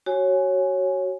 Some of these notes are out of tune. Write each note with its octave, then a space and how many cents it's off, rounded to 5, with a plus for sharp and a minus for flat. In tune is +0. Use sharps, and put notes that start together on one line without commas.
F#4 +25 C#5 -10 G#5 +5